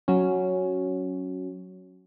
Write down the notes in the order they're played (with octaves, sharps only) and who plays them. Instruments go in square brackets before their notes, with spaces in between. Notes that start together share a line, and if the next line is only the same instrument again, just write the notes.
[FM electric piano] F#3 C#4